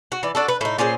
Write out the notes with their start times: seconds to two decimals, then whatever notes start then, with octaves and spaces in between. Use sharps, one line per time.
0.12 F#4
0.23 E3 D5
0.35 D4 F#4 A4
0.48 B4
0.61 A2 D#4
0.78 A#2 C#4 G#4 C5